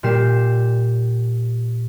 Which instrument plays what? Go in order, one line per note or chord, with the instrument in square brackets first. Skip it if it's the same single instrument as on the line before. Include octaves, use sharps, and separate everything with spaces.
[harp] A#2 G3 G4 C7 E7